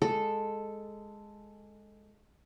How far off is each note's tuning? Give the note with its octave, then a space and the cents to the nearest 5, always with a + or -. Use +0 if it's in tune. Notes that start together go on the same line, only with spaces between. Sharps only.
G#3 +0 A4 +0